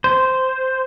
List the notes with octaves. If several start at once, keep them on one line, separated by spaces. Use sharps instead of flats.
C5